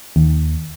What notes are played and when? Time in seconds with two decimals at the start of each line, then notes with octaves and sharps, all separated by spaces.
0.16 D#2